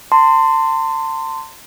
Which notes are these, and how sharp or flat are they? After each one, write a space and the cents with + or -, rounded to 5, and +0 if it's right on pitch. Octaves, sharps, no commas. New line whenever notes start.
A5 +35 C6 -10